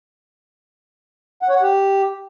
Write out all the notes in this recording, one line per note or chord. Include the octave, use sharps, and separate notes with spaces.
F#5
C#5
F#5
G4